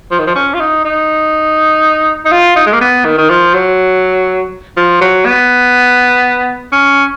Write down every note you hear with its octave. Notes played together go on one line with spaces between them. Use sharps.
F3
D#3
F3
C#4
F4
D#4
D#4
D#4
F4
D#4
G#3
A#3
B3
D#3
D#3
F3
F#3
F3
F#3
B3
C#4